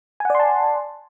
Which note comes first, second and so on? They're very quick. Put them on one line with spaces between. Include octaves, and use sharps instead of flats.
G#5 F#5 D5 C6 A5